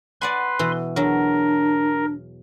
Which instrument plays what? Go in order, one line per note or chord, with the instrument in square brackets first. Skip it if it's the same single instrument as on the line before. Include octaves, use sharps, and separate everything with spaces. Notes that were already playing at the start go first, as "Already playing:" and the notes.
[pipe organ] B4 C6 [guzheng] D5 F#5 G#5
[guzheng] B2 E3
[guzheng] E2 F#3 [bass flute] D4 [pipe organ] A#4